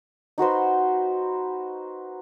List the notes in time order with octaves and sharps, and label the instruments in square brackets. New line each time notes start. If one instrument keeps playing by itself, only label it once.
[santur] D#4 F#4 B4 C5